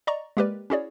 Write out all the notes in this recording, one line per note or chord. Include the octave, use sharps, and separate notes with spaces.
D5 D#5 A#5 C#6
G#3 A#3 G4 A#4 B4 D5
C#4 E4 F#4 G#4 C#5 D5